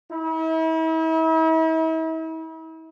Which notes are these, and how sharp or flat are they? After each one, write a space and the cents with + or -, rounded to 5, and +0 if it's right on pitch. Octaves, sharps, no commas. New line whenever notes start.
E4 -40